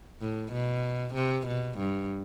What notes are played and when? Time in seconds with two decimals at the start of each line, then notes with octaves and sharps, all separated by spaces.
0.21 A2
0.53 B2
1.15 C3
1.48 B2
1.79 G2